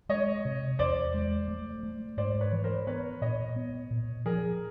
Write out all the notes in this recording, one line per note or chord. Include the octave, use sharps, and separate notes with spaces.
G#3 C#5 D#5
C3
E2 C5 D5
G#3
A3
A3
G#2 C5 D5
B4 C#5
E3
A#4 C5
B3 B4 C#5
A#2 C#5 D#5
B3
A#2
F3 G#4 A#4